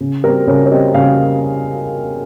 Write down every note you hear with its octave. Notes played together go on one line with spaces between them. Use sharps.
C#3
G3 C4 A#4
C#3 C#5
C#5
G3 C4 D#5
C#3 F5